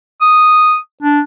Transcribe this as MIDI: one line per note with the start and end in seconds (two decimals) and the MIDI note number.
0.21 0.76 87
1.02 1.20 62